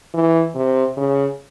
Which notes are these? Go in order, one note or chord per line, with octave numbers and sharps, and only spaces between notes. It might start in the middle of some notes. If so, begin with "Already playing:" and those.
E3
C3
C#3